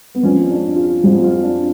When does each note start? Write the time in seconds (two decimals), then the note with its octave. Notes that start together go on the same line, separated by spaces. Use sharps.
0.15 B3
0.23 F2 F3 C#4
0.50 D4
0.76 F4
1.03 F2 F3 F#4
1.24 F4
1.44 D4